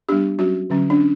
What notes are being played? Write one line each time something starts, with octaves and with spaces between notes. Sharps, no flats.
G3 B3 D4 G4
F#3 C#4 F#4
D3 F#3 C#4
D4
C#4